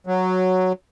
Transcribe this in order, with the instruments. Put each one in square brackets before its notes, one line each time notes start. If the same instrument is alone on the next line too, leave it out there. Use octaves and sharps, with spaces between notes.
[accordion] F#3